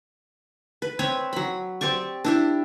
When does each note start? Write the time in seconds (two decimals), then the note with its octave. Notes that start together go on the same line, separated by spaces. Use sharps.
0.82 B4
0.99 C4 B4 C#5
1.33 F#3 B5
1.81 C4 G4 D5 C#6
2.24 D4 E4 G4